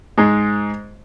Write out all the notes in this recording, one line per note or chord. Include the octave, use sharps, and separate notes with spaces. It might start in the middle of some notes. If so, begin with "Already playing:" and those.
G#2 G#3